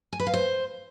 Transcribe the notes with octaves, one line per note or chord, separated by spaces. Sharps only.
G#5
B4
F5
C5